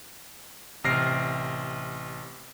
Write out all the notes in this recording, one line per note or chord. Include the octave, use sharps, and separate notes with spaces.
A1 C3 F6 A#6 C7 D7